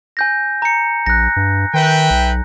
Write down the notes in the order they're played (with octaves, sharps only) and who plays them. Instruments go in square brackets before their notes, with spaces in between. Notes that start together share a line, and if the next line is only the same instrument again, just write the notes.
[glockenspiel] G#5 G6 A#6
A#5 C#7
[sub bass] A#1 [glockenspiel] F#6 A#6
[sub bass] G2
[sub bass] D#3 [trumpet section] B4 E5 G5
[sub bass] B1